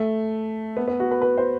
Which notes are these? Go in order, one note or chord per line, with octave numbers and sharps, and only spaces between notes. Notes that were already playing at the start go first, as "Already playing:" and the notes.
Already playing: A3
B3
B3
F#4
B4
B4
C5